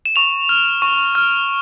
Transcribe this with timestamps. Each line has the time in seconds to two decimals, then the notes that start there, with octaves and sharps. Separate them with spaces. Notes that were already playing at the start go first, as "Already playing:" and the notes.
0.05 E7
0.16 C#6 F7
0.49 F6
0.82 C#6
1.15 F6